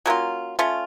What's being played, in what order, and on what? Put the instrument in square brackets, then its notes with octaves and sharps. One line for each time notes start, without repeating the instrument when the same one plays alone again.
[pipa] F#3 A#3 C#4 F4
A3 C#4 F4